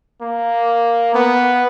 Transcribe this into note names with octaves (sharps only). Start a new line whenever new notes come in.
A#3
B3